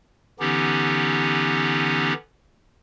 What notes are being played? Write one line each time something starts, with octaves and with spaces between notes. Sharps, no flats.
D3 E3 B3 C#4 D#4 G4